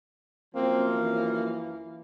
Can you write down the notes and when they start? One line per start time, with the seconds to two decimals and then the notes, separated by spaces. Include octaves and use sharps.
0.55 F#2 F3 A#3 C4
0.95 E3